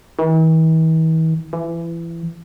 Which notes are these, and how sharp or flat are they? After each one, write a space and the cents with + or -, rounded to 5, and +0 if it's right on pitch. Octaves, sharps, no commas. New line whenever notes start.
E3 -45
E3 +25